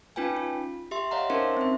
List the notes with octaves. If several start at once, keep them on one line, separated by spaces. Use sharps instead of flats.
C#4 D#4 F4 B4 G5 G#5
F4
G4 E5 C6
C#5 D#5 F5 F#5 A#5
C#4 D#4 A#4 C5 E5 C6
C4 E5